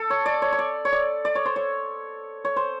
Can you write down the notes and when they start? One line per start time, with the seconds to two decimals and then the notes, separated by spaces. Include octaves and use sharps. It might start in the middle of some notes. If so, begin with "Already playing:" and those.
Already playing: A4
0.10 C#5
0.26 D5
0.42 C#5
0.52 C#5
0.59 D5
0.85 C#5
0.93 D5
1.25 D5
1.35 C#5
1.46 C5
1.56 C#5
2.45 C#5
2.56 C5